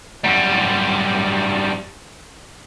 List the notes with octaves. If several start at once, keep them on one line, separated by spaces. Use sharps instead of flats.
F#2 G3